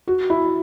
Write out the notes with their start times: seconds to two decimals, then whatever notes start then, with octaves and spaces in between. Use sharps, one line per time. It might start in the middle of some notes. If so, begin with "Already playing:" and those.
0.07 F#4
0.30 E4